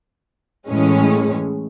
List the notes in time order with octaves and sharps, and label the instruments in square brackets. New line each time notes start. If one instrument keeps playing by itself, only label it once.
[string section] A2 E3 G#3 C#4